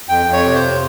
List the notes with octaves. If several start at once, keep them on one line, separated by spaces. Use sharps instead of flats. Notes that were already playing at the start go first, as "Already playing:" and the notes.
F2 G5
F2
C#5
C3
C5
F2